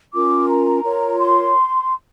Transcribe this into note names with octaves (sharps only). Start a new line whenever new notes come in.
C#4 F4 A#4 D6
A#5
F4 A#4 C#5
C6